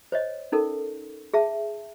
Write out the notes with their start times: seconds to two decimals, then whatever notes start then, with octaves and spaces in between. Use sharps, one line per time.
0.12 C5 C#5 D#5
0.52 C#4 D#4 A4 A#4
1.34 G#4 E5 A5